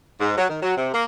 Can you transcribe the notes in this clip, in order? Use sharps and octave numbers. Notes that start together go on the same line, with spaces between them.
G#2
F#3
D#3
F#3
C3
A#3